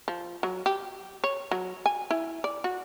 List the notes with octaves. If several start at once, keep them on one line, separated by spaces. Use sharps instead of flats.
F3
F#3
G4
C#5
F#3
G#5
E4
D5
F#4